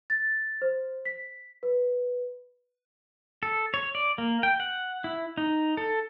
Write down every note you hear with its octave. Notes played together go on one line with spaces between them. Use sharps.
A6
C5
B6
B4
A4
C#5
D5
A#3
G5
F#5
E4
D#4
A4